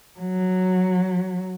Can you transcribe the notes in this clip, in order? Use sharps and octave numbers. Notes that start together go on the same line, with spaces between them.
F#3